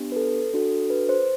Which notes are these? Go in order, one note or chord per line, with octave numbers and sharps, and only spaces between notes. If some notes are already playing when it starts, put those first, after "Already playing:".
Already playing: B3 D4 G4
B4
A4
D4 F#4 A4
B4
C5